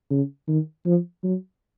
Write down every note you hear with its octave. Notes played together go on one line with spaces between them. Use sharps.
C#3
D#3
F3
F#3